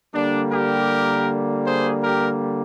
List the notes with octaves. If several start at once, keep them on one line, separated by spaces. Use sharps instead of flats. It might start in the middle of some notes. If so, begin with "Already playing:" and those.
D3 G3 A#3 D4
G4 A#4
G#4 C5
G4 A#4